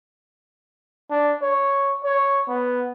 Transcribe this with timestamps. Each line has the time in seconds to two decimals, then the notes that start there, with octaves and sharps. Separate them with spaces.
1.10 D4
1.42 C#5
2.04 C#5
2.48 B3